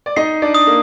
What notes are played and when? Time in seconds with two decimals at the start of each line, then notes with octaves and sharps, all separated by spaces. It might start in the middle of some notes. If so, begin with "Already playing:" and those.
0.06 D5
0.16 D#4 D#5 C7
0.42 D4 D5
0.54 D#6
0.67 A#3